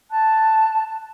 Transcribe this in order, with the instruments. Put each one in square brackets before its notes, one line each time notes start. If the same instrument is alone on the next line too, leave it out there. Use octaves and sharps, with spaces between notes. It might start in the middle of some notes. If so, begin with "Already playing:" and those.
[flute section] A5 F#6